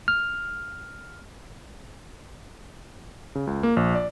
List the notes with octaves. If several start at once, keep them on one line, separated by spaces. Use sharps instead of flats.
F6
C#3
C#2
A#3
A#1
D5